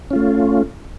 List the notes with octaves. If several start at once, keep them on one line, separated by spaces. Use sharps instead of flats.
A3 C#4 F4